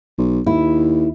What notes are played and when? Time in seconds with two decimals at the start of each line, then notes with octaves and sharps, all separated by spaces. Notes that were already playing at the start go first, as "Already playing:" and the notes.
0.18 B1
0.46 D#2 E4